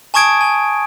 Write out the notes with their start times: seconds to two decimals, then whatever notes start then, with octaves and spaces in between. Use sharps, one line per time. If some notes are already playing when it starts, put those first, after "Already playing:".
0.14 G#5 A5 C#6 D#6 G#6 D7
0.41 G#5 G#6